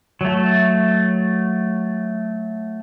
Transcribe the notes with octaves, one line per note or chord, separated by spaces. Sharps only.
F#3 A3